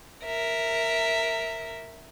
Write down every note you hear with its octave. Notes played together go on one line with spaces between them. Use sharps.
A#4 E5